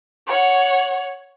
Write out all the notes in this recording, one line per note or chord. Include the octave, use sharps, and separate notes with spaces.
C#5 F#5